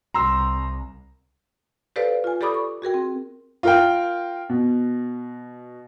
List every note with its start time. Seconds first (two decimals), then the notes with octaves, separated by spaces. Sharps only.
0.14 C2 A#5 C6 E6
1.96 G4 A4 B4 C5 D5 F5
2.24 F4 G#5
2.41 G4 A4 D5 B5 D6 D#6
2.54 C#6
2.82 F#4 G#4 A#4 G5
2.94 C4
3.63 F4 A#4 G5
4.49 B2